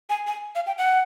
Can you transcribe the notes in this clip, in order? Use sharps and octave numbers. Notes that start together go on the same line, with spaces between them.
G#5
G#5
F5
G5
F#5